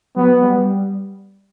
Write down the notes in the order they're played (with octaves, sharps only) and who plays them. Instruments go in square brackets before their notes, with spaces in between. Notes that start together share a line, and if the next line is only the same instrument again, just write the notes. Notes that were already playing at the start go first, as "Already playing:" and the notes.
[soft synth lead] F#3 [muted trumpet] B3
[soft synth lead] G3
G3